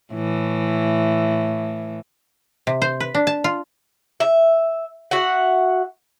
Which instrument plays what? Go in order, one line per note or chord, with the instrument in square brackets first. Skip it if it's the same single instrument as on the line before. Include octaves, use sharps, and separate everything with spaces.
[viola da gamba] A2 E3
[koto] C3
C5
B4
D4
A5
F4
[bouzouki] E5
F#4 E5 F#5